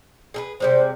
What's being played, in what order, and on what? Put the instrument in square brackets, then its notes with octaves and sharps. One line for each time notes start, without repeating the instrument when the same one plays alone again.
[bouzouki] G#4 A4 B4
[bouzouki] C3 G3 G#3 [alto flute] C5